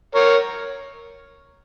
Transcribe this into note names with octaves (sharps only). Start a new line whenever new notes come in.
A#4 C#5